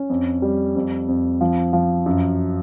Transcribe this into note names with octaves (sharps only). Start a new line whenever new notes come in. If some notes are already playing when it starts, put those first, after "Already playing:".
Already playing: C#4
F2
G3
F2
F2
F3
F3
F#2